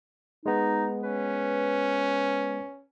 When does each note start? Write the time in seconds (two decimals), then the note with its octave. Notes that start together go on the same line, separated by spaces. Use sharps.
0.46 G#3 B3 D#4
1.03 C#4 B4